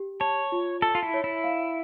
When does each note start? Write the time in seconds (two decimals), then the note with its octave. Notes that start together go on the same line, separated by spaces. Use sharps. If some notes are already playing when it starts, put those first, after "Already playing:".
Already playing: G4
0.20 C#5 A5
0.52 F4
0.82 A4 A5
0.95 F4
1.03 E4
1.14 C#5
1.24 E4
1.44 F5